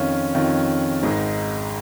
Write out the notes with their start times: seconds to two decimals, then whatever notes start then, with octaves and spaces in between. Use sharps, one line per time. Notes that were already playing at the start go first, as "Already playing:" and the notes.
Already playing: F2 D#3 C#4 F4
0.35 F2 D#3 C#4 F4
1.03 G#1 G#2 G#3 D#4